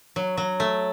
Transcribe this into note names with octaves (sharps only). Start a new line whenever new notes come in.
F#3
F#3
A3